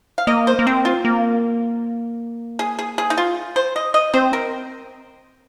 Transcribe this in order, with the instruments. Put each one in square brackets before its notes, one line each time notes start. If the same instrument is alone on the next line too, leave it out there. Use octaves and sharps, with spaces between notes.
[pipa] F5
[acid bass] A#3 [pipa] D#5
[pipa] C5
[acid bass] A#3
[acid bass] C4 [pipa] A#4
[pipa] F4
[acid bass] A#3
[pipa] G#4
G#4
G#4
D#4
F4
C5
D#5
D#5
[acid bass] C4 [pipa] C5
[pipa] A#4